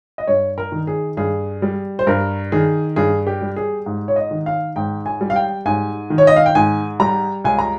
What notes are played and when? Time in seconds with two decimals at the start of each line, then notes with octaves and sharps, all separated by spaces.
0.18 D#5
0.27 G2 C#5
0.58 A#4
0.72 D#3
0.87 G#4
1.17 G2 G#4
1.62 G3
1.99 C5
2.07 G2 A#4
2.52 D#3 G#4
2.96 G2 G#4
3.27 G4
3.41 G3
3.56 G#4
3.86 G#2
4.08 C#5
4.16 D#5
4.31 D#3
4.46 F5
4.76 G#2 G5
5.06 G#5
5.21 G3
5.30 F5
5.36 G5
5.66 G#2 G#5
6.10 D#3
6.18 C#5
6.27 D#5
6.36 F5
6.46 G5
6.55 G#2 G#5
7.00 G3 A#5
7.44 C#2 G#5
7.59 A#5